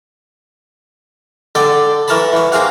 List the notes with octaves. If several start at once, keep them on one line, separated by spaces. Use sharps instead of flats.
D3 A4 D5 G5
E3 A#4 C#5 A5 B5
E3 C#5
A#3 C4 G#4 F5 F#5